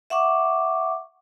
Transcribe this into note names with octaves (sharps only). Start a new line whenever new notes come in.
E5 F#5 C#6 D6